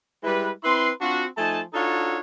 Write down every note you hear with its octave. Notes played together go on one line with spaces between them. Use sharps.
G3 G#3 E4 B4
C4 E4 B4 C6
C4 D4 F4 F#4
F3 A3 D#4 G#5 A5
D4 D#4 F4 F#4 A4 C#5